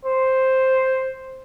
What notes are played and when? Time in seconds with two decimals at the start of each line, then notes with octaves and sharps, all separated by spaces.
0.05 C5